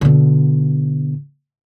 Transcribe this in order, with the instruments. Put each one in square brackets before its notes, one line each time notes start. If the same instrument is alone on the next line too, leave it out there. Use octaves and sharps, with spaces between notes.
[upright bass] B2 D3